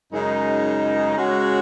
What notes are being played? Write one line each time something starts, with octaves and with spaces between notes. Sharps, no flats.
F#2 C#3 G#3 D#4
C#3 G#3 C#4 F#4